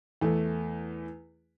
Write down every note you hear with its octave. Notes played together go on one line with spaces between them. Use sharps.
E2 A3